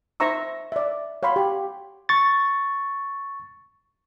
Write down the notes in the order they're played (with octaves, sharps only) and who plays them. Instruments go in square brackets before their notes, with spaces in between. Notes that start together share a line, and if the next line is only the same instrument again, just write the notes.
[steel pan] D#4 C5 E5 A#5 C#6 E6
D5 E5
C#5 F5 F#5 B5 C6
G4
[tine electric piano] C#6 A6